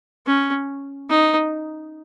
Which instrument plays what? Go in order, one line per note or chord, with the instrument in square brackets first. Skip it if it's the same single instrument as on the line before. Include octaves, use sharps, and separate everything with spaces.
[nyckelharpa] C#4
D#4